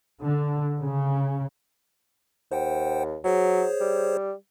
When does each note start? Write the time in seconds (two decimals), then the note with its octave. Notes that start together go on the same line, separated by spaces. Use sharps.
0.23 D3
0.81 C#3
2.52 D#2 C5 F#5 G5
3.24 F#3 G#4 C5 C#5
3.81 G3